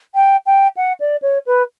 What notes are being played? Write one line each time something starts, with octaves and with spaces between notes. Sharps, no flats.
G5
G5
F#5
D5
C#5
B4